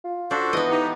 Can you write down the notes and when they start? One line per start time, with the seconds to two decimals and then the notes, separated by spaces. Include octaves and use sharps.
0.04 F4
0.31 D4 F#4 A4 C5
0.53 E3 B3 D#5
0.71 D#4 G4